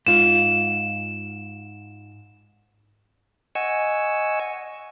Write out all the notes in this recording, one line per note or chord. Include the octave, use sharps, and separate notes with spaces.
G#2 F4 E7
D#5 F#5 G#5 C#6 E6